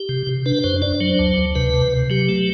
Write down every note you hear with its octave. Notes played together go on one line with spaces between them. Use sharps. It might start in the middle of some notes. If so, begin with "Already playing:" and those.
Already playing: G4
C3
C3
D4 B4
F#2 C5
D4 D5
F#3 C5
D2
D2
C3 B4
C3
C3
F#3 G4
A3